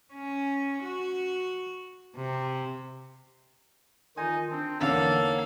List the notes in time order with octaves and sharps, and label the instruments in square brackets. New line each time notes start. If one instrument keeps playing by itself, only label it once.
[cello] C#4
F#4
C3
[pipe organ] D#3 F4 [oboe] D#4 [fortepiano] G#5
[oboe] C4 [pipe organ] D4
[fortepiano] E2 D3 [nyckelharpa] A#3 F5 [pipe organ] D#4 C#5 E6 [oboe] A4